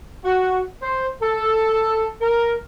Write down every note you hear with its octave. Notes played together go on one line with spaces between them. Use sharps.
F#4
C5
A4
A#4